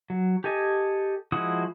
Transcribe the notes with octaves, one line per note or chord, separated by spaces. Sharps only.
F#3
G4 A4 D#5 G#5
F3 G#3 E4 F#4 D#6